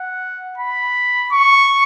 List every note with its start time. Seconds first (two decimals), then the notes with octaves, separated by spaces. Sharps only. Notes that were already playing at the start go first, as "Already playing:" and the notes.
Already playing: F#5
0.58 B5
1.33 C#6